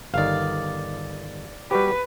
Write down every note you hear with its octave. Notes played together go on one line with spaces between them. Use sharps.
G1 D#3 D5 F5
G3 F#4 G4 B4